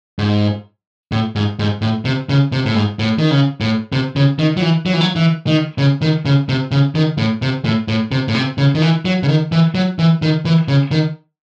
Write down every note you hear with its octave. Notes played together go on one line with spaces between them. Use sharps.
G#2
A2
G#2
G#2
A2
C3
C#3
C3
A2
G#2
A2
D#3
C#3
A2
C3
C#3
D#3
F#3
E3
F#3
E3
F#3
E3
D#3
C#3
D#3
C#3
C3
C#3
D#3
A2
C3
A2
A2
C3
A2
C3
C#3
D#3
E3
F#3
C#3
D#3
E3
F#3
E3
D#3
E3
C#3
D#3